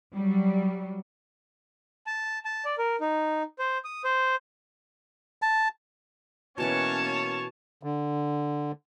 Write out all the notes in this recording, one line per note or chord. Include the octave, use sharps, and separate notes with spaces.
F#3 G3
A5
A5
D5
A#4
D#4
C5
D#6
C5
A5
B2 E3 A#3 C#4 B4 C#5 A5
D3